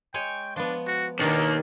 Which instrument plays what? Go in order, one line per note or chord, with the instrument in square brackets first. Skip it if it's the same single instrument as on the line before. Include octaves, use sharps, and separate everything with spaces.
[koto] G#3 C#5 G#5 [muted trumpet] G5
[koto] F3 B3 [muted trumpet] D4
[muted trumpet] F#4
[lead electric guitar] D#2 [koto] B2 D#3 D4 [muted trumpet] A#4